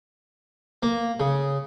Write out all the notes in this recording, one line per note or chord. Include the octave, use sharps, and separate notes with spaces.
A#3
C#3